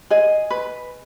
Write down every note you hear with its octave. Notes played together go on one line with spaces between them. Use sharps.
G#4 D#5
B4